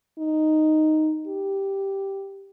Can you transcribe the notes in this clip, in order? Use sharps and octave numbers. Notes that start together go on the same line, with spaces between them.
D#4
G4